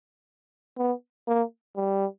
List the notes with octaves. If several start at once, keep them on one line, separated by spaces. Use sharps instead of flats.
B3
A#3
G3